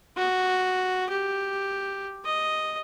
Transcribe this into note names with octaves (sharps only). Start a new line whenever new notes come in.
F#4
G4
D#5